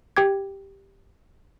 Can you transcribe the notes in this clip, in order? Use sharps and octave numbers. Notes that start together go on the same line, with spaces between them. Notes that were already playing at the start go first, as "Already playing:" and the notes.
G4 G5 D6 G#6